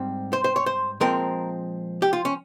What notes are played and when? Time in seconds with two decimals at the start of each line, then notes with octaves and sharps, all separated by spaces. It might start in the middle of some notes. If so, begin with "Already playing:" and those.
Already playing: G#2 G3 C4
0.33 C5
0.44 C5
0.56 C#5
0.66 C5
1.00 A#2 F3 G#3 C4 A#4
2.02 G4
2.13 F4
2.25 C#4